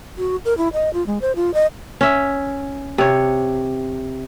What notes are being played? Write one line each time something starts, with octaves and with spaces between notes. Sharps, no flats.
F#4
A#4
E4
D#5
F4
G#3
C5
F4
D#5
C#4 E5
C3 C#5